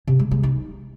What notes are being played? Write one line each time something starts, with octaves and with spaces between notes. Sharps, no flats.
C3
G#3
G#3
D#4